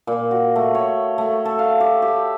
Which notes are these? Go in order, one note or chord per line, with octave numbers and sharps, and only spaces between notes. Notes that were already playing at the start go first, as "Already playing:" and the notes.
A#2
F#4
A3
C#5
A3
A4
F5
G4
G4